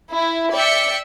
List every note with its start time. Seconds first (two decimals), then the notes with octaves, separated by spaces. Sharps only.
0.14 E4
0.55 D5 E5 G5 C#7